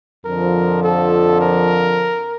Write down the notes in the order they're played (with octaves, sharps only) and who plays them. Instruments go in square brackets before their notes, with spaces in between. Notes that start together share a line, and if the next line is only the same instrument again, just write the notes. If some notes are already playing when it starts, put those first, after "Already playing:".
[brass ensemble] F2 D3 F3 [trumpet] A#4
[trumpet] A4
A#4